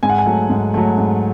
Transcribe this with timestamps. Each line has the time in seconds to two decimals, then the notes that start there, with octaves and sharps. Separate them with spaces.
0.03 G#2 G#5
0.09 F#5
0.18 G#5
0.26 F#3 A3
0.49 G#2
0.74 F#3 A3
0.98 G#2